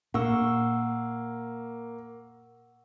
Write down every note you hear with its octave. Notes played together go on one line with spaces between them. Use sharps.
A#2 A#3 F#5 C#6 E6